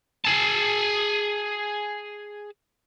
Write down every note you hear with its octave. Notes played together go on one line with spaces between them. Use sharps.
G#4 A5